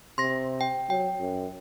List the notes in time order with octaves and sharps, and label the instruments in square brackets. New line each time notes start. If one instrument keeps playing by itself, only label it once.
[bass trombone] C3 [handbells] C6 A#6
[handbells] G5
[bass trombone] F#3 [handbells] G5
[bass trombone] F#2